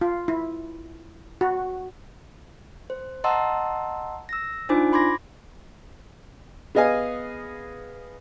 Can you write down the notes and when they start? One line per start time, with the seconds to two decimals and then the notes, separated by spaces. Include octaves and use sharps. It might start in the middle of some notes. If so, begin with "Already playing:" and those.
0.01 F4
0.28 E4
1.41 F#4
2.90 C5
3.24 D#5 F#5 A5 A#5 C6 E6
4.29 E6 A#6
4.69 D4 D#4 F4 C5 G#5 D6
4.92 B5 C6 D6 G#6 A#6
6.75 B3 G#4 D#5 F5 G#5